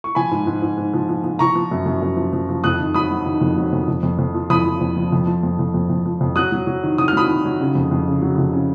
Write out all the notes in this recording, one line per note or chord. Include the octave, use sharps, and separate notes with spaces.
C#6
F3 G#5 B5
G#2
G#2
G#2
G#2
F3
F3
F3
F3 A#5 C#6
F3
F#2
F#2
F#2
F3
F3
F3
F2 D#6 F#6
D#3
F#3 B5 D#6
F#3
D#3
F2
F#3
F2
F2
F2
F2
F3
F2 B5 D#6
F3
F2
F3
F2
F3
F2
F2
F2
F2
F3
F2
F#3 D#6 F#6
F#3
F#3
D#3
F#3 D#6
F6
F#3 B5 D#6
D#3
F#3
C#3
F2
F2
C#3
F#3
F2
C#3